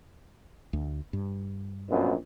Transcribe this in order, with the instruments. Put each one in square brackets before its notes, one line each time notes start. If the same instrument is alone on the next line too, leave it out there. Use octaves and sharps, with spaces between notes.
[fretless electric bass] D2
G2
[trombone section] A#1 F#2 B2